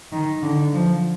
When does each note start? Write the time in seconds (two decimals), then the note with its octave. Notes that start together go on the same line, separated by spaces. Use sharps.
0.12 D#3
0.42 D3
0.73 F3